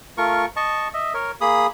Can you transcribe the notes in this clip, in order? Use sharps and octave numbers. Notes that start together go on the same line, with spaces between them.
A3 F4 A#4 C#6
D#5 A5 C#6
D#5 E5
A#4 C#5
A#3 G#4 B5 D#6